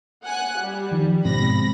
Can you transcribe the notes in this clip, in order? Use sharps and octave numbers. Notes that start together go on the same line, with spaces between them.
F#5 G#5 F#6
G3
D#3 F3
G#2 B2 C4 B5 A#6